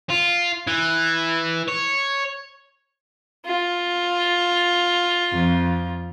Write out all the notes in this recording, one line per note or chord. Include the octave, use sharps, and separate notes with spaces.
F4
E3
C#5
F4
F2